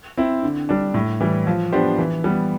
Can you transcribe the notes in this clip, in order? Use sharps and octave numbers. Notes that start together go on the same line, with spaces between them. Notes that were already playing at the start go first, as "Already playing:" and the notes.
C4 E4
D3
G3 D4
A2
E3 G3
F3
B3 D4 G4 C5
E3
G3 B3